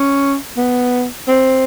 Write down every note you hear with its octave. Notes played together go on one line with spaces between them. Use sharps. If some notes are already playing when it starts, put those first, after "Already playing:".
Already playing: C#4
B3
C4